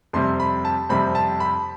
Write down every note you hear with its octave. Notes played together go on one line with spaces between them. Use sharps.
F2 C3 G3 C4 C6
B5
A5
F2 C3 G3 C4 B5
A5
B5